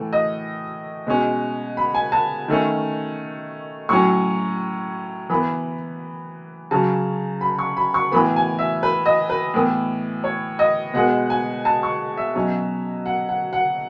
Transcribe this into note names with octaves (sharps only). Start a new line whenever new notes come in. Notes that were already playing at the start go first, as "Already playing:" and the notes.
Already playing: A2 E3 A3
D#5
B2 G#3 C#4
B5
G#5
A5
D#3 A3 C#4
A2 F#3 C#4 C#6
E3 B3 B5
C#3 F#3 C#4 A5
B5
C#6
B5
C#6
A2 E3 B3 B5
G#5
E5
B4
D#5
B4
A2 E3 B3
C#5
D#5
B2 G#3 B3 F#5
G#5
A5
C#6
E5
B2 F#3 C#4
F#5
F#5
F#5